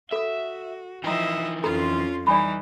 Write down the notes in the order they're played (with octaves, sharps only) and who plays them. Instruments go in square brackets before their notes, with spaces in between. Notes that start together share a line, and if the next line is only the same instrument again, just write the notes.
[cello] F#4 [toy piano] A4 D#6 [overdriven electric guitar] E5
[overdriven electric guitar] E3 D#4 [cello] F3 E5 [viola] D#5 [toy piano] G5 A#5
[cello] F2 C#4 [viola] F4 C6 [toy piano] A4 A#5
[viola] E3 D#4 [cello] G3 [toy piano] D5 G#5 B5